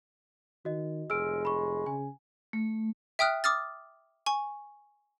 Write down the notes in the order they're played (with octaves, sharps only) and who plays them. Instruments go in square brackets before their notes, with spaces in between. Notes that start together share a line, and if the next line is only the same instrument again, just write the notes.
[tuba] D#3 [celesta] F#4 D#5
[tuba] F1 [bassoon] G#3 [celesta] E6 F6 D7
[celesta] B5 C#6
[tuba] C#3 [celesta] G#5
[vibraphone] A3
[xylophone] E5 G5 D#6 F6 F#6
D6 D#6 F6 A6
G#5 C#6